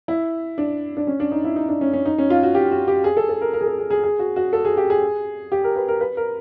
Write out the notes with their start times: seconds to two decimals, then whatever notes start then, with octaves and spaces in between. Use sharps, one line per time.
0.08 E4
0.58 D4
0.97 D4
1.07 C#4
1.20 D4
1.32 D#4
1.44 E4
1.56 D#4
1.69 D4
1.81 C#4
1.93 C#4
2.05 D#4
2.18 C#4
2.30 F4
2.43 F#4
2.55 G4
2.72 F#4
2.88 G4
3.04 G#4
3.17 A4
3.29 A4
3.41 A#4
3.53 A#4
3.61 G#4
3.66 A4
3.79 G#4
3.90 G#4
4.03 G#4
4.19 F#4
4.36 F#4
4.53 A4
4.65 G#4
4.77 G4
4.90 G#4
5.52 G4
5.64 A#4
5.76 B4
5.88 A#4
6.01 B4
6.17 A#4